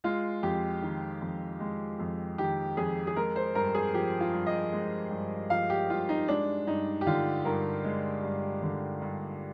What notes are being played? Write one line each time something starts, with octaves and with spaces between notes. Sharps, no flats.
G#3 F4
F2 G4
D#3
F2
G#3
F2
D#3 G4
F2 G#4
G#4
G#3 A#4
C5
G2 A#4
G#4
F3 G4
F4
G2
D#5
G#3
G2
F3 F5
G4
G2 F4
D#4
G#3 D4
G2 D#4
G4
D3 F4
G2 A#4
G#3
G2
D3
G2